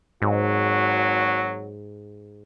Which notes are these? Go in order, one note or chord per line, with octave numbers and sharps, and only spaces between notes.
G#1 G#2 F#3 F#4